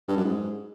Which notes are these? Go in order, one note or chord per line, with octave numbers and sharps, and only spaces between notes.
G2
F#2
G#2